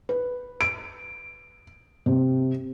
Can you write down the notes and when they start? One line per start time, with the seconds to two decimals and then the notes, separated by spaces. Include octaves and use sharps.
0.09 B4
0.61 D7
2.06 C3